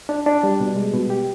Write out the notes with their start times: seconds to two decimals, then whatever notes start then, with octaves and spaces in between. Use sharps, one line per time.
0.09 D4
0.26 D4
0.43 G3
0.60 B2
0.76 G#3
0.94 B2
1.10 G4